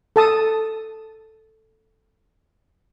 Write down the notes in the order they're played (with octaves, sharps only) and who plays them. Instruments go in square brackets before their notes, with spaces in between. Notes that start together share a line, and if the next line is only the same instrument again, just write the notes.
[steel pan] A4 A5 D#6